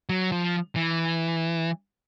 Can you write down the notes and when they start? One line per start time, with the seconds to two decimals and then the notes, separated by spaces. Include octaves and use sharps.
0.09 F#3
0.32 F3
0.76 E3